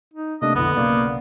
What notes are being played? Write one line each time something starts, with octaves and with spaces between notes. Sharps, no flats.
D#4
C3 A3 A#3 D4 D#5
B1 F2 D3 B3 E4
B1 C#3 A#3 D5